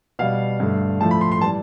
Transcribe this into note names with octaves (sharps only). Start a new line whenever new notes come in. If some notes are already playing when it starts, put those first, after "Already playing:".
B2 G3 F5
G2 D3 A3
A2 F3 A3 A5
B5
C6
C6
E3 G3 A5